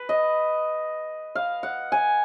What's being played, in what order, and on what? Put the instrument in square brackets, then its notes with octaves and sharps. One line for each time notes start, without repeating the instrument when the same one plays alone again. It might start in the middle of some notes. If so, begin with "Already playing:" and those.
Already playing: [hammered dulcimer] B4
D#5
F5
F#5
G#5